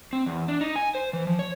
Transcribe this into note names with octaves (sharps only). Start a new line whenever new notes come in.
C4
E2
D4
D#4
G#5
C5
E3
F3
C#5